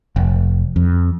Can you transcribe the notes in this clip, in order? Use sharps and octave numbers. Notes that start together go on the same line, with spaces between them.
F1
F2